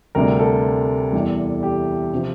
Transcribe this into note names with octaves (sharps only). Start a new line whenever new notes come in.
D2 C3 G3 A#4
A4
E2 E3 G3
G4
C3 F3